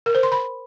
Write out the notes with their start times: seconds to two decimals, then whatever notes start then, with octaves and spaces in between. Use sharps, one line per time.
0.06 A#4
0.15 C5
0.23 C6
0.32 B5